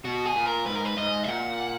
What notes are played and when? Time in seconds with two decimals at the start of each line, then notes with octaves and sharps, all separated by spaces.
0.05 B2 F#4
0.25 G#4
0.35 A#2
0.46 A#4
0.66 G#2 B4
0.75 A#4
0.85 B4
0.97 G#2 D#5
1.23 E5
1.28 A#2 F#5